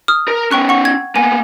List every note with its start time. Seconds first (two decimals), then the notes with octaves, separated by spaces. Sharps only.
0.08 D#6 F6
0.28 A#4 A#5
0.51 B3 C#4 G5 C#6 F#6
0.69 F#5 C#6
0.85 G#6
1.16 A#3 B3 G#5